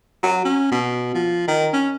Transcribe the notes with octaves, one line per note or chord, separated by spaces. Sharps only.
F#3
C#4
B2
F3
D#3
C#4